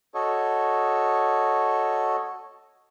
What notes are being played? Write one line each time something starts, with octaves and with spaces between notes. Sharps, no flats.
F#4 A4 C#5 D#5